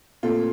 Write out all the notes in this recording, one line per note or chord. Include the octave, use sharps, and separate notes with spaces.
A#2 A3 C4 F4 A4